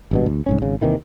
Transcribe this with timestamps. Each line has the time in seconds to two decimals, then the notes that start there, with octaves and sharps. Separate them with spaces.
0.11 G#1 G2 B2
0.26 D2
0.46 C2 G#2 C#4
0.62 G#1 C#3
0.81 D#2 C3 D#3 E3